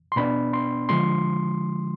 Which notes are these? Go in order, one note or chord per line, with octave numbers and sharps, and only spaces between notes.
C6
B2 B3 D4 B5
C6
D3 F3 G#3 C6